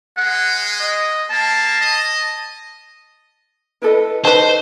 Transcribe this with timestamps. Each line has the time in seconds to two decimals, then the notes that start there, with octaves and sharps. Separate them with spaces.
0.17 G#3 F#5
0.80 D#5
1.30 A#3 A5
1.81 D#5
3.82 E4 A4 B4 D#5
4.25 D#4 B4 C5 A5